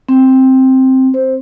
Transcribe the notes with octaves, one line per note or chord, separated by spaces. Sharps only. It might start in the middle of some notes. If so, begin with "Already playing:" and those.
C4
C5